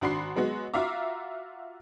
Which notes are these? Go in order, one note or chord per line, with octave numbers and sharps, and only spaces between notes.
G#1 D4 F#4 B5 C6 C7
F#3 G#3 B3 F#4
F4 F#4 E5 F5 A#5 D6